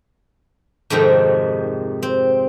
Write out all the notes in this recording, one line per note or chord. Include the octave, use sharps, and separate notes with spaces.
F2 G#2 C3 D#3
C4